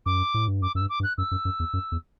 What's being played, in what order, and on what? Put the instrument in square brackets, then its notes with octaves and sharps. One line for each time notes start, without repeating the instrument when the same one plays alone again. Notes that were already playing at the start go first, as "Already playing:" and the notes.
[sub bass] F#2 [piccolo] D6
[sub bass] A2
G2
[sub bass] F#2 [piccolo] D6
[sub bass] F#2 [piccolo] E6
[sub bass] G2
[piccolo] D6
[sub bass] G2
[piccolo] F#6
[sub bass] F#2 [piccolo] E6
[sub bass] F#2
F#2
E2
F#2
E2